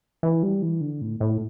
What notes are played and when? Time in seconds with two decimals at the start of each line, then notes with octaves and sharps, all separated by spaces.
0.23 E3
0.43 G3
0.62 E3
0.81 D3
1.01 A2
1.20 A2